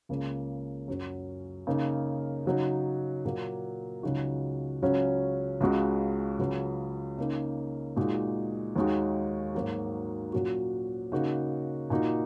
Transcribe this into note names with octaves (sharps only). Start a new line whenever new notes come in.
C#2 C#3 A#3
F#2 F#3 C#4
C#3 A#3 D#4
C#3 F#3 D#4
A#2 F#3 A#3
C#2 C#3 F#3 D#4 F#4
C#2 C#3 F#3 C#4
C#2 C#3 G#3 F#4
C#2 C#3 F#3 C#4
C#3 A#3 D#4
A#2 G#3 D#4 F#4
D#2 D#3 G#3 D#4 F#4
G#2 F#3 A#3 F#4
A#2 F#3 C#4 F#4
C#3 A#3 D#4 F#4
A#2 A#3 D#4 F#4